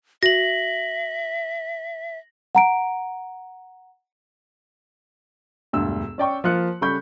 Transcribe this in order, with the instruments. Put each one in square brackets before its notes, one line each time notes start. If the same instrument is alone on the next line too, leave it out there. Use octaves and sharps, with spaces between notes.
[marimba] F#4 [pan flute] E5 [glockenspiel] A#6 F#7
[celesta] F#5 A#5 D7
[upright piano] E1 D2 G2 E6
C#4 D5 G5 C#6
F3 A#3 F4 F#6 C#7
C#3 G3 A4 B5 C#6 G6